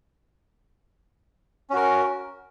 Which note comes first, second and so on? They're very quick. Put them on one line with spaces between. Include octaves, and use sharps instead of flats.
C#4 F#4 A#4